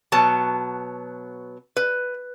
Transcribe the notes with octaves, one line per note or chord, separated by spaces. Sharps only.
B2 F#3 B3 A5
B4